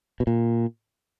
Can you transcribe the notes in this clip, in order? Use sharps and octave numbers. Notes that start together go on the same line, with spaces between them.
B2
A#2